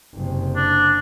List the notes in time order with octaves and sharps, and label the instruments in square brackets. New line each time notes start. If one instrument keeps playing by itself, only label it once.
[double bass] F#1 C3
[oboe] D4